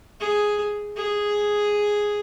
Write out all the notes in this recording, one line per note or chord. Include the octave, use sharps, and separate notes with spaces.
G#4
G#4